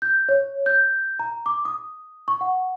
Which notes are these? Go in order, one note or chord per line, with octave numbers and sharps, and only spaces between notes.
G6
C#5
G6
A#5
D6
D#6
C#6
F#5